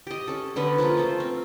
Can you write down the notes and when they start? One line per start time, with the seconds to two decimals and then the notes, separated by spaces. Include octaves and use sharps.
0.07 G4 D#5
0.28 C#4 A4
0.56 D3 B3 C#4 B4
0.78 F3 A#3 C#4 F4
0.97 A3 C5
1.20 C4